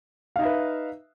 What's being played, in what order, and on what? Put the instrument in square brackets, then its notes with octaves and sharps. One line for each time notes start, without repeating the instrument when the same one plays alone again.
[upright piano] F5
D#4
E5
B4